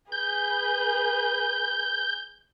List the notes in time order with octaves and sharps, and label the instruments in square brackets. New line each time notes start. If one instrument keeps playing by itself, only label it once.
[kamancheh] G#4 B4 [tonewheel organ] G6